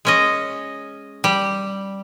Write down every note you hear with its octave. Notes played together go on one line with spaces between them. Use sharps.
G#3 C#4 D#5
G3